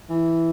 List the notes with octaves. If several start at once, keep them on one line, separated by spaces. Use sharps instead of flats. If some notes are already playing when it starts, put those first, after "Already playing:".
E3